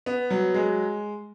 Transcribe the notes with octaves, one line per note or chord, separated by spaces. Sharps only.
B3
F#3
G#3